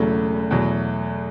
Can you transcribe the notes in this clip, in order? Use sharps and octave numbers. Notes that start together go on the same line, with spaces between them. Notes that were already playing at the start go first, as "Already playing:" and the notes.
Already playing: E1 E2 C#3 F#3 A3
E2 B2 F#3